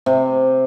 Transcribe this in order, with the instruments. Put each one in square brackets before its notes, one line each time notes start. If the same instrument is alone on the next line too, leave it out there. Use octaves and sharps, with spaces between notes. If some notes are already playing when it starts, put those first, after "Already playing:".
[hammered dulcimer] C3